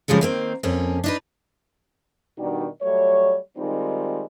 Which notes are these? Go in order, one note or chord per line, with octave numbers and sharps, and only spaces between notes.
C#3 F3 G3 G#3 A4
D#3 A#3 C4
F2 A#3 C#4
D4 D#4 B4
B2 D#3 G3 D4 D#4 F#4
F#3 G3 A3 C#5
D#3 G3 G#3 C4 D#4 F4